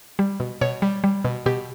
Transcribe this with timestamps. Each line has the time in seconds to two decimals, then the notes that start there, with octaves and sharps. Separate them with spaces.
0.19 G3
0.40 B2
0.61 B2 C#5
0.82 G3
1.04 G3
1.25 B2
1.46 B2 G4